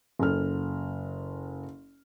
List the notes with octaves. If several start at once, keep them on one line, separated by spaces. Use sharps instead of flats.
F#1 A4 F6